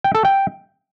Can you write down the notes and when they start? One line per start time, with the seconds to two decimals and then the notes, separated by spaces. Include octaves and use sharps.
0.04 G5
0.15 A4
0.25 G5